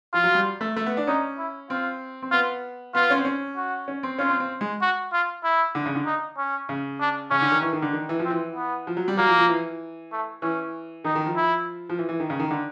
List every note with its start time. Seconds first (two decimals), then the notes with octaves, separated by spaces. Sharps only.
0.13 F3 F4
0.24 F#3
0.35 G3
0.61 A3
0.76 A3
0.86 B3
0.97 D4
1.07 C#4 D#4
1.38 E4
1.70 C4 F4
2.22 C4
2.32 B3 F4
2.95 B3 F4
3.10 C#4
3.18 C4
3.25 C#4
3.57 F#4
3.88 C#4
4.03 C4
4.19 C#4 F4
4.30 C4
4.40 C4
4.61 G#3
4.81 F#4
5.13 F4
5.44 E4
5.75 D3
5.86 C#3
5.95 D3
6.06 D#4
6.38 C#4
6.69 C#3
7.00 D4
7.31 C#3 C#4
7.41 D3
7.52 D#3
7.62 E3
7.73 D#3
7.82 D3
7.93 D#3
8.09 E3
8.19 F3
8.25 C4
8.31 E3
8.55 B3
8.87 F3
8.97 F#3
9.08 G3
9.17 F#3 A#3
9.28 F3
9.39 F3
9.49 E3
10.12 A3
10.42 E3 C#4
11.04 D#3 D#4
11.15 D#3
11.26 F3
11.36 E4
11.89 F3
11.99 E3
12.09 E3
12.20 D#3
12.30 C#3
12.40 D#3
12.51 D3